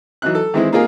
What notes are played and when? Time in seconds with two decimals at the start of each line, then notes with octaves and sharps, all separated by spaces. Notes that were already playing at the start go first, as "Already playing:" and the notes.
0.22 E3 F#3 D#4 F#6
0.35 A4
0.54 D#3 E3 G#3 C4 D#4 E4
0.72 C3 A#3 D#4 F4 G#4 A#4